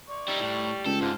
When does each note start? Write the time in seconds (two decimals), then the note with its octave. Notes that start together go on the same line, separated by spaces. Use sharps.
0.10 D5 C#6
0.28 G3 D#4 E4
0.40 A2
0.86 C#2 A4 G5
1.01 G#2 D3 F4 C5